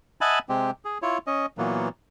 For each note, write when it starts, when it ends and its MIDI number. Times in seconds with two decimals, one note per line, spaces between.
0.21 0.39 75
0.21 0.39 76
0.21 0.39 78
0.21 0.39 80
0.21 0.39 81
0.21 0.39 83
0.49 0.71 48
0.49 0.71 56
0.49 0.71 60
0.49 0.71 67
0.85 0.98 68
1.02 1.18 64
1.02 1.18 65
1.02 1.18 73
1.27 1.46 61
1.27 1.46 75
1.58 1.88 46
1.58 1.88 52
1.58 1.88 54
1.58 1.88 58
1.58 1.88 59